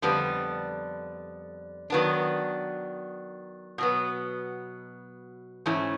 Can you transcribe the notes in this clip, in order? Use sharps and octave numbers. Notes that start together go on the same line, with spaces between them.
F2 D3 G3 B3 D4
D#3 F#3 B3 D4
B2 F#3 B3
G#2 E3 A3 C#4 E4